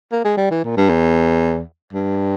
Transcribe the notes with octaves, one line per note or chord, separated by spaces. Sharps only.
A#3
G#3
G3
E3
A#2
G2
E2
G2